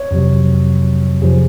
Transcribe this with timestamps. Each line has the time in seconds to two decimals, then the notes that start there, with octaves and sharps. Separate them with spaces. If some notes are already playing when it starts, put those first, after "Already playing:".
Already playing: C#5
0.11 F2 C3 F#3
1.22 F2 C3 F3 G#4